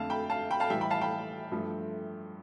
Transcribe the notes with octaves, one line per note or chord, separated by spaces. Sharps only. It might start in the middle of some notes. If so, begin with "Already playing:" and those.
Already playing: F2 D3 A3 F5 A5
G5 B5
F5 A5
G5 B5
F5 A5
A2 E3 G3 E5 G5
G5 B5
F5 A5
G5 B5
G2 F3 A3